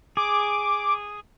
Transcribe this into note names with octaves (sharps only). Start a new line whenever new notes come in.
G#4 D6